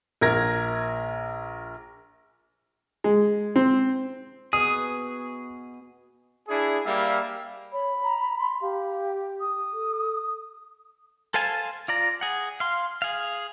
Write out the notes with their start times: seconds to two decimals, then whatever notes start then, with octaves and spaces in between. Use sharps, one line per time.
0.21 A#1 A#4 G#6 A#6
3.04 G#3
3.56 C4
4.53 B2 G#4 D#6
6.48 D4 E4 G#4
6.85 G3 A#3 E5 F5
7.73 C#5 B5
8.04 A#5
8.39 C6
8.62 G4 F5
9.41 D#6
9.73 A4
11.34 A4 C5 F5 G#5 A5
11.88 F4 D5 A#5
12.21 G#4 F#5
12.60 F5 C6
13.02 G#4 F5